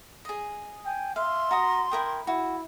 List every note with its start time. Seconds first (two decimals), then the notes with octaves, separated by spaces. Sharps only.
0.25 G#4 D#5
0.86 G5 G#5
1.16 E5 F5 C6
1.51 F#4 A#5 D#6
1.92 E4 A#4 G5 D#6
2.27 E4 F#4